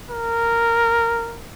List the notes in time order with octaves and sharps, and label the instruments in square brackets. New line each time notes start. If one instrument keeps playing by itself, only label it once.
[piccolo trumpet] A#4